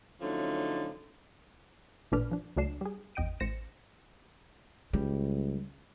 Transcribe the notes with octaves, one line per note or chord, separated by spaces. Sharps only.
D3 F3 F#3 A3 C#4 D#4
A1 A#2 A3 D4 B4 F6
F3 D4
C#2 F#3 A3 D4 C7 E7
G3 G#4
G#1 E2 D#5 G5 D7 D#7
A1 C5 A#6 C#7 E7
C#2 G3